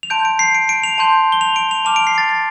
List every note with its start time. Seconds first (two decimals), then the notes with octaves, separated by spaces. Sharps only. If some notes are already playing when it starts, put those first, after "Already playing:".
0.03 F7
0.10 A5 C6 G6 D7
0.25 D7
0.39 C7
0.55 D7
0.69 D7
0.84 F7
0.98 A5 C6 G6
1.32 G7
1.41 F7
1.56 D7
1.71 F7
1.85 A5 D6 F6 F7
1.96 D7
2.07 C7
2.18 A6
2.29 A6